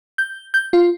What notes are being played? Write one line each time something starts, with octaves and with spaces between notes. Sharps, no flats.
G6
G6
F4